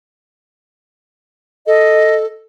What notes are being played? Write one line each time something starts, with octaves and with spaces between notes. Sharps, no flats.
A4 D#5